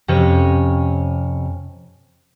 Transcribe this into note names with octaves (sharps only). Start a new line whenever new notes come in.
F2 C3 C#4 C#5